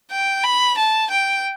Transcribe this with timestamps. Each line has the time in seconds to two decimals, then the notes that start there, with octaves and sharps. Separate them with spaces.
0.11 G5
0.44 B5
0.77 A5
1.10 G5